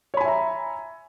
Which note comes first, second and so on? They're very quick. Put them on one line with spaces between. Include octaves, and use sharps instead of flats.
C#5 B5 G#5 E5 A#5